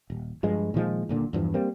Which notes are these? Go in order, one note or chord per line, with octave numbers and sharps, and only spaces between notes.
D#1
G2 F3 G#3
A#2 D#3 F3 G#3
D#1 A#2 D3
E2 G2 F3
G3 A#3 C4